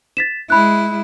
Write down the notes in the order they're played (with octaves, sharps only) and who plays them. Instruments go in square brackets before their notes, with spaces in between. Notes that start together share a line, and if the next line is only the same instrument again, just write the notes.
[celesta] A6 B6 E7
[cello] G#3 E4 [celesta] B5 F#6